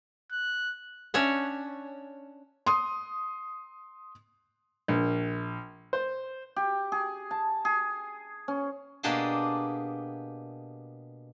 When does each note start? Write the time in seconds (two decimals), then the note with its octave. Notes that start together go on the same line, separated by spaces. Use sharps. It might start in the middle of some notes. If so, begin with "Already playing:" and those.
0.32 F#6
1.14 C#4 D4 C#5 E5 F#5
2.66 C6 D#6
4.88 A#1
5.93 C5
6.56 G4
6.92 G#4
7.31 A5
7.65 G#4
8.48 C#4
9.03 B2 A#3 D4 G4 G#4 A5